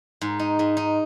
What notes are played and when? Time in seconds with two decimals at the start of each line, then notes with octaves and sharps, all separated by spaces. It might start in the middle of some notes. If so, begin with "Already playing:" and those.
0.21 G#2
0.39 D#4
0.59 G#2
0.77 D#4